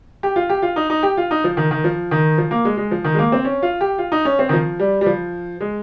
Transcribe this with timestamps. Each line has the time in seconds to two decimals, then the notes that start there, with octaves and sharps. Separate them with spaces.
0.23 G4
0.36 F4
0.50 G4
0.62 F4
0.76 D#4
0.90 D#4
1.03 G4
1.17 F4
1.31 D#4
1.44 F3
1.57 D#3
1.71 D#3
1.84 F3
2.11 D#3
2.38 F3
2.51 A#3
2.65 G#3
2.77 G#3
2.91 F3
3.04 D#3
3.14 G#3
3.19 A#3
3.32 C4
3.45 C#4
3.62 F4
3.81 G4
3.98 F4
4.12 D#4
4.25 C#4
4.39 C4
4.49 D#3
4.53 F3
4.80 G3
5.01 G3
5.06 F3
5.60 G#3